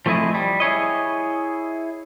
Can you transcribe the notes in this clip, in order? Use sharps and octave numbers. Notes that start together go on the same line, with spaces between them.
F3 A3 C4 E4 G#4 D#5
G3
E4 G#4 C#5 D#5